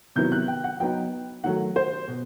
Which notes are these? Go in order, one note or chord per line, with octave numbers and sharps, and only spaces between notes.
C3 D#3 F#3 B3 E4 G6
F#6
G5
F#5
F#3 B3 D#4 G5
D#3 F#3 A3 F#5
C5
B2